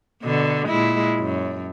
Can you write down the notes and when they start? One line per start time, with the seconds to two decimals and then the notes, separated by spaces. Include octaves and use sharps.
0.23 B2 D3
0.67 A#2 G#3 E4
1.20 F#2